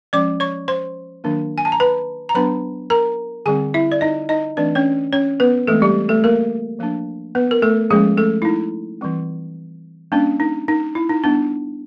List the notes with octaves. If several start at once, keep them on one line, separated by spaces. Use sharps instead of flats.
F3 G#3 C#4 D5 D6
C#5 C#6
C5 C6
D#3 F#3 A#3 D4
G#5
A5
A#5
B4 B5
A#5
F#3 B3 D4 B4 B5
A#4 A#5
D3 G3 C4 G#4 G#5
E4 E5
D5
D#4 D#5
D#4 D#5
E3 A3 C4 D4 D5
C#4 C#5
C#4 C#5
B3 B4
E3 G#3 A3 C4 A4
G3 G4
A3 A4
A#3 A#4
F3 A#3 D4
B3 B4
A#4
A3 A4
F3 G#3 A#3 C#4 G#4
A3 A4
E4
D#4
E3 G3 C4
G3 A#3 C#4 D4
D#4
D#4
E4
D#4
G3 B3 D4